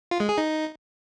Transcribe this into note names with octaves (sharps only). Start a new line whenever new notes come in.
F4
G#3
G#4
D#4